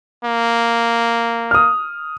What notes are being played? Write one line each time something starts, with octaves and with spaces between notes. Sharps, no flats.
A#3
D#6 F6